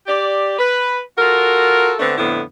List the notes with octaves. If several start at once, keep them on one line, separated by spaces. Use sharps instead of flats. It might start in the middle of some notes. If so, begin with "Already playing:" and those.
G4 D5
B4
F4 F#4 A4 A#4
D3 A3 B3 C4 D4
F2 A2 D3 B3 E4